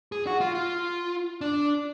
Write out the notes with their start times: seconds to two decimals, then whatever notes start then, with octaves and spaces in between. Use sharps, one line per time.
0.12 G#4
0.27 F#4
0.41 F4
0.55 F4
1.41 D4